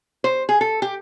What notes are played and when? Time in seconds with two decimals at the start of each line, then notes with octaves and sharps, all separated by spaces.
0.24 C5
0.49 G#4
0.61 A4
0.82 G4